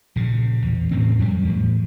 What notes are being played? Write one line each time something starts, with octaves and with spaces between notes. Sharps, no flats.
A#1 C#3
E2
F1 A2 C4 C#4
F2 F#3 G3
E2 A2